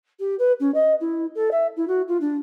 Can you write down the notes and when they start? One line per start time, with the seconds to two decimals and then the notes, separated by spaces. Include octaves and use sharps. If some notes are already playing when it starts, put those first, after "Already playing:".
0.19 G4
0.38 B4
0.59 C#4
0.74 D#5
1.00 E4
1.34 A4
1.51 E5
1.76 E4
1.87 F#4
2.07 F4
2.20 D4